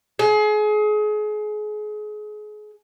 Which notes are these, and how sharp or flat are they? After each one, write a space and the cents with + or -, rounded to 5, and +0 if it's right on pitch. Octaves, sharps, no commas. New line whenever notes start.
G#4 +30